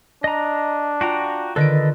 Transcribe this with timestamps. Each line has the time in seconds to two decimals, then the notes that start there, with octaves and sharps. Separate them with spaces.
0.24 D4 D#5 A#5
1.01 F4 F#4 G5 A#5
1.56 D3 D#3 A4 B4 D#5 D7